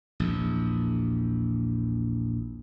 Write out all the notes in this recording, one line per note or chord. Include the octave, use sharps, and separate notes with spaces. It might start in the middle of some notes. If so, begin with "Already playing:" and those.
A#1 E2